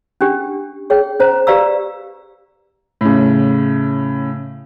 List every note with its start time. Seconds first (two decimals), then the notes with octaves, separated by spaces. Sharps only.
0.21 C#4 D4 G4
0.90 G#4 C#5 G5
1.20 C#4 C5 A#5
1.47 G4 B4 D5 F5 A#5 E6
3.01 A2 C#3